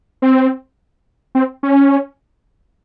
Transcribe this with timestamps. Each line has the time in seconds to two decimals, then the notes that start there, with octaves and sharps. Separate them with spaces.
0.22 C4
1.35 C4
1.63 C#4